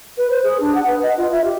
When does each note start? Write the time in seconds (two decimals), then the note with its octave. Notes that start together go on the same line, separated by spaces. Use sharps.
0.17 B4
0.30 C5
0.43 G#4
0.60 D4
0.74 F#5
0.87 B4
1.02 D#5
1.17 F4
1.32 E5
1.44 G4